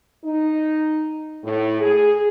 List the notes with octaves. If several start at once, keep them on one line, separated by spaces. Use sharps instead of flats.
D#4
A2
G#4